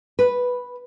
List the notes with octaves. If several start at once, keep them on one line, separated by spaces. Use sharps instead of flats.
B4